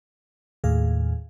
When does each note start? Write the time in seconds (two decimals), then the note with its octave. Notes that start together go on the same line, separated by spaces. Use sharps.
0.64 D#2 A2 G#4 F5